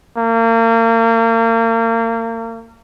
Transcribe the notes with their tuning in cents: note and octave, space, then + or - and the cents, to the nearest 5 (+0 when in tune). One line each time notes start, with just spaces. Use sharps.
A#3 -35